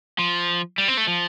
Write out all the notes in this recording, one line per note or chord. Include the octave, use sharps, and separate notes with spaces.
F3
G3
C4
A3
F3